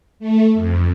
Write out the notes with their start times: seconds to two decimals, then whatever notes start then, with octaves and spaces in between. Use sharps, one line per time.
0.20 A3
0.55 F2